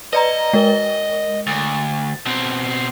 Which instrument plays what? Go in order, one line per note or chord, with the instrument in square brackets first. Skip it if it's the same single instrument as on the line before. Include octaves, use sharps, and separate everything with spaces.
[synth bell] B4 D5 A#5 [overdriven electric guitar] D#5
[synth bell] G#3 A#4 G7
[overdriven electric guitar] D2 [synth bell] A6
[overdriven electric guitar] B2 C4